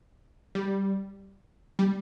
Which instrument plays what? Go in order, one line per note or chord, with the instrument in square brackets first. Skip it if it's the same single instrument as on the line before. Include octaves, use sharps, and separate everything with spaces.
[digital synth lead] G3
G3